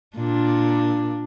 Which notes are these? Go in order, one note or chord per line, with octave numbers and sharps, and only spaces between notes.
A#2 D4